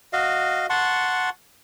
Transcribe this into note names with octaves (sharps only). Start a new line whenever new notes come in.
F#4 D#5 F5
F#5 A5 C6 C#6